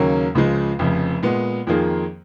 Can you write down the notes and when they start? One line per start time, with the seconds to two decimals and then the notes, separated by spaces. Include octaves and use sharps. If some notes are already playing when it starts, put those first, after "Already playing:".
Already playing: D#2 C#3 F#3 A#3 C#4
0.35 C#2 C#3 F3 G#3
0.79 F1 F2 C#3
1.23 A#2 G#3 B3
1.67 F2 D#3 A#3 F4 G#4